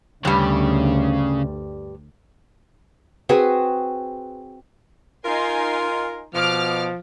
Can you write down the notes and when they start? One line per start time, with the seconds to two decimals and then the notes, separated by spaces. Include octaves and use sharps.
0.25 D2 G2 C#3 G3
3.29 C4 F#4 G#4 B4
5.25 D#4 F4 A#4 G#5 C6
6.34 B2 F3 D6 F6